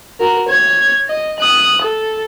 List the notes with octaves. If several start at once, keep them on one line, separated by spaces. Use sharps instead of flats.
F#4 A#4
C#5 G#6
D#5
D#6 F#6
A4